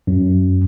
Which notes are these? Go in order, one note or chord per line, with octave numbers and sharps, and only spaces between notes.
F#2